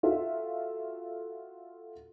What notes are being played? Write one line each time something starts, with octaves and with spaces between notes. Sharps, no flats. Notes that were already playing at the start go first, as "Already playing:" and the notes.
F4 F#4 A4 E5